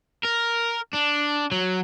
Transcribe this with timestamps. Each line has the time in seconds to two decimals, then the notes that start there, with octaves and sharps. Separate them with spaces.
0.25 A#4
0.93 D4
1.51 F#3